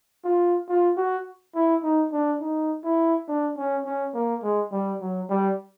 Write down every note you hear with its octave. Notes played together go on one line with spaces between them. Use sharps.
F4
F4
F#4
E4
D#4
D4
D#4
E4
D4
C#4
C#4
A#3
G#3
G3
F#3
G3